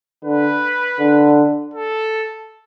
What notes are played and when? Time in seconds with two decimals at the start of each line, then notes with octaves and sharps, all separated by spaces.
0.24 D3 B4
0.99 D3
1.74 A4